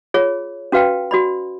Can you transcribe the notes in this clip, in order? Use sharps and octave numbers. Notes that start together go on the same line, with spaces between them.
F4 G#4 C#5
C#4 F#4 B4 F5 G5 A5
F#4 D5 B5